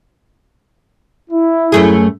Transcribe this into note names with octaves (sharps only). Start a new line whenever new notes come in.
E4
F#2 A3 G#4